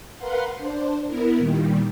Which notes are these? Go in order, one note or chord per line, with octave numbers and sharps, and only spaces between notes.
A#4 B4 F5 F#5 C6
D4 C5
B3 E4 A#4
A#2 D#3 G3